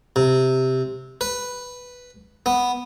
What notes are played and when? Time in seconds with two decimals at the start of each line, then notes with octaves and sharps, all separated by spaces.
0.16 C3
1.21 B4
2.46 B3